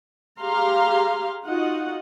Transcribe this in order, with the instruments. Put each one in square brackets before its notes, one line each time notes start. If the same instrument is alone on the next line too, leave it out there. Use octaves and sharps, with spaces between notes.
[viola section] G4 G#4 F5 A#5 C6
D#4 F4 F#4 D#5 F#5